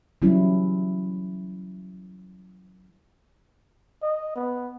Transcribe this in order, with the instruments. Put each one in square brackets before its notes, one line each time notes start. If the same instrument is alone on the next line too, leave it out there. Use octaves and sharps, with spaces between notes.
[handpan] E3 F#3 G3 C#4 E4
[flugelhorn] D#5
B3